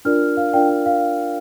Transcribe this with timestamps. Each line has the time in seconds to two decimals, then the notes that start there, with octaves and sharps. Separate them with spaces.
0.05 D4 F4 A#4 D5 F6
0.37 F5
0.53 D4 F4 A#4 D5 G5
0.69 G5
0.86 F5